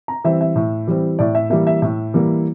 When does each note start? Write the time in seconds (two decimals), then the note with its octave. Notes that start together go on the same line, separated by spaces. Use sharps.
0.08 A#5
0.24 E3 G3 C4 E5
0.41 E5
0.56 A2
0.87 E3 G3 C4
1.19 A2 D5
1.35 E5
1.50 E3 G3 A#3 E5
1.67 E5
1.82 A2 E5
2.14 E3 G3 A#3